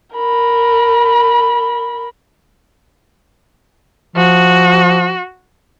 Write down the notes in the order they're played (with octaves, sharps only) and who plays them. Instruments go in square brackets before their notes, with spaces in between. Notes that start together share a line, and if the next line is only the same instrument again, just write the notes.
[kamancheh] A#4 B5
[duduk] F3 [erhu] F#4